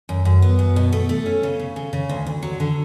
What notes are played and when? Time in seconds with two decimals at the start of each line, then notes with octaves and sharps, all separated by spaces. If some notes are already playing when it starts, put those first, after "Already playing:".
0.09 F#2
0.25 F#2
0.42 B3
0.59 F#2
0.76 B2
0.93 A3
1.09 A3
1.26 C#4
1.43 C#3
1.60 C#3
1.76 C#3
1.93 C#3
2.09 D2
2.27 D2
2.43 F#3
2.60 D3